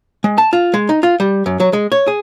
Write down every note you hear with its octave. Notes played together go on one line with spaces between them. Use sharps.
G#3
A5
F4
G#3
D#4
F4
G3
F#2
F#3
G#3
C#5
G#4